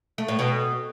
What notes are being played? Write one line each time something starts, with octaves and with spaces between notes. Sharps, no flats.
A3
A2
B2